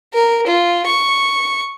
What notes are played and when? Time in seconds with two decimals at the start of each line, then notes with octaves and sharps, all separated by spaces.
0.14 A#4
0.47 F4
0.87 C#6